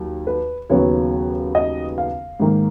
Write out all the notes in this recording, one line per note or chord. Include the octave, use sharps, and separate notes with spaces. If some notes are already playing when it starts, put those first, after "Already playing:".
Already playing: D#2 F#3
B4
D#2 C#3 F#3 B3 C#5
D#5
F5
G#2 D#3 A#3